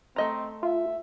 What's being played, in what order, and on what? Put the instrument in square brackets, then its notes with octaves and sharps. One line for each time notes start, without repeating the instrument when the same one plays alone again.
[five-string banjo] A3 D#5 A#5 [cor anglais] C4
[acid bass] F4 [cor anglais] E5